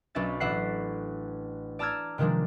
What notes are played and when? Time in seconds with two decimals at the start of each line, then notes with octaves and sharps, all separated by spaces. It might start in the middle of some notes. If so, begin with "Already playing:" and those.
0.15 B1 C#4 D4 E5 A6
0.40 A1 D4 E5 F#5 C7
1.79 D5 A5 A#5 E6 F6 G#6
2.18 C3 D#3 F3 G#3 D4